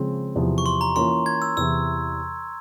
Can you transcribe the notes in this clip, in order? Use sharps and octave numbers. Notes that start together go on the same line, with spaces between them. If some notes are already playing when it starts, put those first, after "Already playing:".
Already playing: C#3 F3 G#3 C4
E2 C3 F3
C#6
C6
A#5
E3 A#3 C#4 F4 A#4 C6
G#6
E6
E2 C3 E3 E6